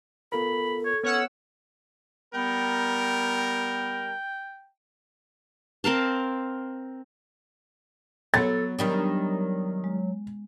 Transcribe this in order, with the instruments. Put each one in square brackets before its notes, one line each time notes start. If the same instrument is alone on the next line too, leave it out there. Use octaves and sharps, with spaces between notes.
[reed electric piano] B3 F4 A#4 [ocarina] A4 [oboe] B5
[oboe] C#5
[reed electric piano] B3 [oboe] C#4 [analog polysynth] C#5 F#5 E6
[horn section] G3 A#4 [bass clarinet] B3 [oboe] G5
[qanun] C4 A#4 F5 A5
[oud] F#3 [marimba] B3 C#5 [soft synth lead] A4 [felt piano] A6
[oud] D#3 G3 D4 [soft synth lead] F#3
[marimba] G#3